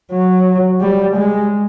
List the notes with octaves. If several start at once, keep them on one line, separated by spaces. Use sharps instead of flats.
F#3
G3
G#3